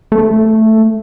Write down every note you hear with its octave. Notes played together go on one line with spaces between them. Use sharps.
A3